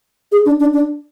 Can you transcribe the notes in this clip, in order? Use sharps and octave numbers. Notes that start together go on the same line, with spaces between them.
G#4
D4
D4
D4